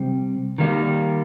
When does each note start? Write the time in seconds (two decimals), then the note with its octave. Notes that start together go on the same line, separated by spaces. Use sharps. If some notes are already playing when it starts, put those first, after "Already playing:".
Already playing: C3 G3 C4
0.58 D#3 G3 A#3